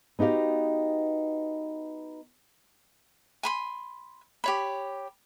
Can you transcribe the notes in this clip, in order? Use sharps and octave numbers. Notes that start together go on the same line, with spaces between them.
B3 D#4 F#4 G4 F5
G#5 B5 C6
G4 C#5 B5